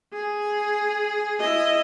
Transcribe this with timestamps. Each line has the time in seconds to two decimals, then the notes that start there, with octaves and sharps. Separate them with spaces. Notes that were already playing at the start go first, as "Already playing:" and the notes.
0.13 G#4
1.40 E4 D#5